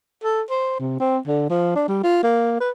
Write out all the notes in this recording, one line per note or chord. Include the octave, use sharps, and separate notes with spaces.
A4
C5
C3
C4
D3
F3
D4
G3
F4
A#3
B4